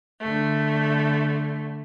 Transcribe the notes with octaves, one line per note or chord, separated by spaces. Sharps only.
D3 A3